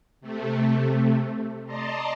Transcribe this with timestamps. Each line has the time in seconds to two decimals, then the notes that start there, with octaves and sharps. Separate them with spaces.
0.21 C3 A3
1.66 D5 D#5 A5 A#5 C6